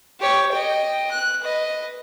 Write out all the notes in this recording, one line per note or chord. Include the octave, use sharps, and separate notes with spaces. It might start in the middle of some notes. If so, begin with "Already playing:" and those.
G4 C#5
D#5 G5
F#6
B4 D#5